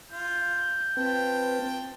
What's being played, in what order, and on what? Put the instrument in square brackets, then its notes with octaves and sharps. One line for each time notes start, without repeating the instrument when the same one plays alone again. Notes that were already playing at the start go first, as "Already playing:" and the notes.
[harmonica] F4 [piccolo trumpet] G6
[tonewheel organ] C4 B4 [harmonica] F4 G5 A5